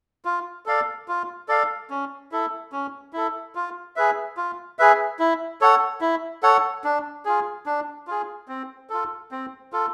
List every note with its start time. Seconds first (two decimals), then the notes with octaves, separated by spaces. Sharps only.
0.25 F4
0.66 A4 D5 F5
1.08 F4
1.48 A4 D5 F5
1.90 C#4
2.32 E4 A4
2.72 C#4
3.13 E4 A4
3.55 F4
3.96 G#4 B4 E5
4.37 F4
4.79 G#4 B4 E5
5.19 E4
5.61 A4 C#5 F#5
6.01 E4
6.43 A4 C#5 F#5
6.84 D4
7.25 F4 G#4
7.66 D4
8.07 F4 G#4
8.48 C4
8.90 F4 A4
9.31 C4
9.73 F4 A4